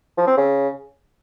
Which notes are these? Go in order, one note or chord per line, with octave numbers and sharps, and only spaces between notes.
F3
C4
C#3